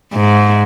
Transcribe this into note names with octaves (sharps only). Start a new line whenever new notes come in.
G#2